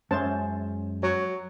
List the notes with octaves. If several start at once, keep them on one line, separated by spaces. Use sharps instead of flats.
F#2 G#3 C#4 C5 E5 A5
F#3 C#5